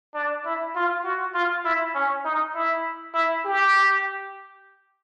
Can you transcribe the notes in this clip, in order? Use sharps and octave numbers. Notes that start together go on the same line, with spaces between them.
D4
E4
F4
F#4
F4
E4
C#4
D#4
E4
E4
G4